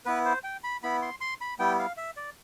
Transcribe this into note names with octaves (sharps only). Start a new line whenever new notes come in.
B3 E4 B4
C5
G5
B5
B3 E4 B5
C6
C6
B5
G3 B3 E4 G5
F5
E5
D5